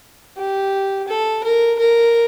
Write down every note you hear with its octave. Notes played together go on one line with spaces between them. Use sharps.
G4
A4
A#4
A#4